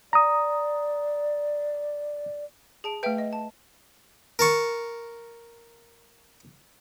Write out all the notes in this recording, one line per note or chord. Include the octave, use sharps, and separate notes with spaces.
D5 A#5 D#6
G#4 A5 D7
A3 B4 E5 G5 D7
D#5
A5
A#4 A5 C#6